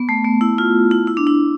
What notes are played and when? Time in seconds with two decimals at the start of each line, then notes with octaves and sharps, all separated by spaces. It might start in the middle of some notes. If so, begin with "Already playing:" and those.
Already playing: B3
0.09 A3
0.25 B3
0.41 E4
0.58 F4
0.91 E4
1.07 E4
1.17 D4
1.27 E4